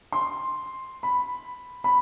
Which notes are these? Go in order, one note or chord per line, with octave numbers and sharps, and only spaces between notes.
C6
B5
B5